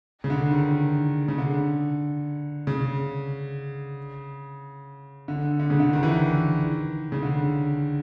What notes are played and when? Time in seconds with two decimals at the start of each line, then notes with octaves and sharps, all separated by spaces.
0.24 C#3
0.30 D3
0.51 D#3
0.72 D#3
1.28 C#3
1.38 D3
2.67 C#3
5.28 D3
5.60 D3
5.70 C#3
5.80 D3
5.93 D#3
6.03 E3
6.13 D#3
7.12 C#3
7.23 D3